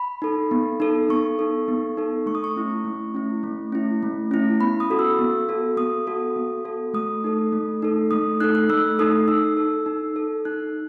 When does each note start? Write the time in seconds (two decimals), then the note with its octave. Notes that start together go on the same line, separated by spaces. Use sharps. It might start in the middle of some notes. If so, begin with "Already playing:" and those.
Already playing: B5
0.22 D#4 A4
0.51 B3
0.80 D#4 A4
1.09 B3 C#6
1.39 D#4 A4
1.68 B3
1.97 D#4 A4
2.26 A3 C#6
2.35 D#6
2.44 C#6
2.56 C#4 E4
2.85 A3
3.15 C#4 E4
3.43 A3
3.72 C#4 E4
4.03 A3
4.31 C#4 E4
4.60 B3 B5
4.80 D#6
4.90 F#4 A4
4.99 E6
5.19 B3
5.49 F#4 A4
5.77 B3 D#6
6.07 F#4 A4
6.36 B3
6.64 F#4 A4
6.94 A3 D#6
7.24 D#4 A4
7.53 A3
7.82 D#4 A4
8.11 A3 D#6
8.40 D#4 A4 F#6
8.55 F#6
8.70 A3 E6
8.99 D#4 A4 D#6
9.28 D#4 E6
9.57 A4
9.86 D#4
10.16 A4
10.45 D#4 F#6